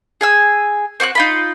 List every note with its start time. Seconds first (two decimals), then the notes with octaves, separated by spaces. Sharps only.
0.21 G#4 G#5 E6
1.00 C4 F#4 C#6 F#6
1.15 D#4 F4 B5